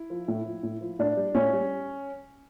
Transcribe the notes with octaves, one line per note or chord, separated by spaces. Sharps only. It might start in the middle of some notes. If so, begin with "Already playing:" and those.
Already playing: E4
F3
A2
F3
A2
F3
A2 D4
G3
A2 C#4
G3